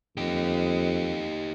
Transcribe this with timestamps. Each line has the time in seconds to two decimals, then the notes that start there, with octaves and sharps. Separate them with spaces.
0.17 F2 D#4 G4